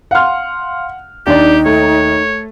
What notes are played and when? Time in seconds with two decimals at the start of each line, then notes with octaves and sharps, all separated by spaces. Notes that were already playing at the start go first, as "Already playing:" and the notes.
0.11 F5 F#5 C6 F6
1.27 D#2 D4 D#4 G4 D5
1.66 A3 C#5